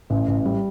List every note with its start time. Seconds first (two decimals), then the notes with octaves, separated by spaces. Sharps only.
0.10 A1
0.28 A1
0.45 G3